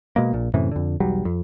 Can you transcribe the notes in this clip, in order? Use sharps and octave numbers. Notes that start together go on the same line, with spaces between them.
B2 G#3 A#3
A#1 A#2
F#2 A2 C3 E3
F2 D3
B1 E2 F#3 G3
F2